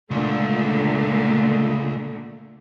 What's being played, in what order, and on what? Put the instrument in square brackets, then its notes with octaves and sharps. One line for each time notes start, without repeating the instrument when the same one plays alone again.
[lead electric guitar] C#2 [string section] A#2 D3 A3